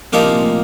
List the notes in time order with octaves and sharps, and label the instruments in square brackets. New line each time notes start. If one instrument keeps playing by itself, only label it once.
[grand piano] A#2 [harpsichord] F3 A#3 D#4 G4
[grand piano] C3
A#2
A2